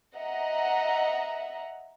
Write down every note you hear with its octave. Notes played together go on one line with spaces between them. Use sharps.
D#5 E5 F#5 A#5